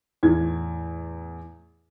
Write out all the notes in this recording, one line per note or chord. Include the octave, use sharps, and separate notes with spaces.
E2 A2 G#6